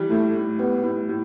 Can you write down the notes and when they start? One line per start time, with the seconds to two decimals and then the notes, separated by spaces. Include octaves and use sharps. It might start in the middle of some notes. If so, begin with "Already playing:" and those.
Already playing: E3 G3
0.10 A2 A3
0.34 A2
0.58 G3 B3
0.83 A2
1.09 A2